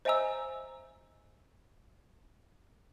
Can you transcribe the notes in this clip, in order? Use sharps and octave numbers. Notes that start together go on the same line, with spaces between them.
C5 D#5 E5 G#5 A#5 E6